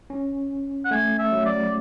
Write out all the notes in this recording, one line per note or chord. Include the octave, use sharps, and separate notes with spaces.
C#4
F#5
A3 G#5
E5
F#3
D5